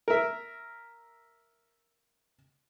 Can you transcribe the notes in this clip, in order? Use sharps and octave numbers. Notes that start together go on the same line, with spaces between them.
A#4 E5